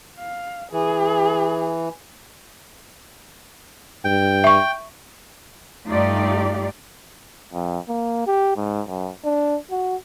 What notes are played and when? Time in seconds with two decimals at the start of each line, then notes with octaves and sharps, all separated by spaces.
0.19 F5
0.72 E3 G#4
4.05 G2 G5
4.44 E5 C#6
5.89 G2 A3 D#4 F4 G4 D5
7.53 F2
7.89 A#3
8.27 G4
8.56 G#2
8.88 F#2
9.25 D4
9.71 F#4